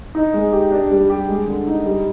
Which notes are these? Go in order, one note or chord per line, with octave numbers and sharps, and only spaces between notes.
D#4
G#3
G4
D4
G3
G4
G#3
D3
D#4
G3